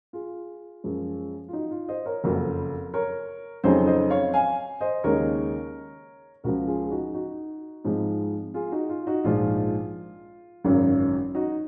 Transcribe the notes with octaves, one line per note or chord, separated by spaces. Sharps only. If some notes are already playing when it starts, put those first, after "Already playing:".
F4 G#4
F#2 F3 G#3
F4
D#4 F#4
F4
C5 D#5
A#4 C#5
F#1 F2 C#3 F#4 A#4
A#4 C#5
F2 C#3 F#3 C4 D#4 G#4 C5
C5 D#5
C#5 F5
F5 G#5
C5 D#5
D#2 C#3 G#3 D#4 A#4 C#5
C#2 C#3 F3 F#4 A#4
F4 G#4
G#4
D#4 F#4
D#4 F#4
G#2 F3 G#3 C4 D#4
F4 G#4
D#4 F#4
F4
D#4 F#4
A#1 G#2 F3 G#3 F4
G#1 F#2 C#3 F#3
D#4 F#4